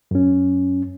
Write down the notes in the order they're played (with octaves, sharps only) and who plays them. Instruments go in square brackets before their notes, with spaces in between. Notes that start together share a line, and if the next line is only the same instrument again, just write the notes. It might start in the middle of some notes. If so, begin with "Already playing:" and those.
[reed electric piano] F#2 C#4